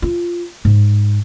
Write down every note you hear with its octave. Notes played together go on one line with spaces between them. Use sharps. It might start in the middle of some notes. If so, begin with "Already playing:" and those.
F4
G#2